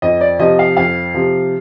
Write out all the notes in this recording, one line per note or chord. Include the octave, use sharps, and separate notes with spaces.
F2 D#5
D5
C3 F3 D#5
F5
F2 F5
C3 F3